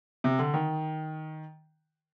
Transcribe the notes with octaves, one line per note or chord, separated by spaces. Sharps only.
C3
D3
D#3